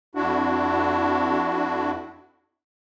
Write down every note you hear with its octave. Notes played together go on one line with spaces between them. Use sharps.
F2 D4 E4 F#4